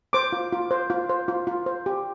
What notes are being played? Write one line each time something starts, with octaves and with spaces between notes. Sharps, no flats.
C5 D6
F4
F4
C5
F4
C5
F4
F4
C5
G4